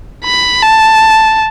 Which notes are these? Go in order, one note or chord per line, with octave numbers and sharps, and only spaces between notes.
B5
A5